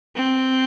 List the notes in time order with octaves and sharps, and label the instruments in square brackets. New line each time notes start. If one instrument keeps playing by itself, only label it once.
[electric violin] C4